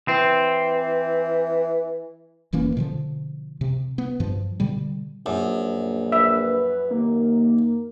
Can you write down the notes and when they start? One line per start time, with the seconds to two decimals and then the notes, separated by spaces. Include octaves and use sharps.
0.08 E3 C4
2.53 F1 E3 A#3 C#4
2.77 B2 D3 F3
3.61 C3
3.98 B3
4.20 G2 F3
4.60 B2 D3 G3
5.26 A#1 F#2
6.12 B4 E5
6.91 D#2 A#3